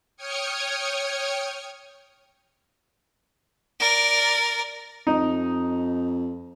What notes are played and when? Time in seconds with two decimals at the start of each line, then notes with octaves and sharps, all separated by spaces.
0.17 C#5 G5 D#6 F6 G#6 C#7
3.80 A#4 D5
5.07 F2 D#4